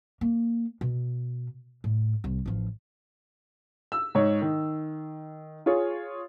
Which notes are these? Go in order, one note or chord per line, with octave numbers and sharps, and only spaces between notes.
A#3
B2
A2
C2
A1 F3
E6
G#2 C#5
D#3
F4 G#4 C#5